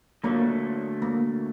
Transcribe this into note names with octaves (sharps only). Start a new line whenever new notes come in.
D3 F#3 A3 A#3
A#3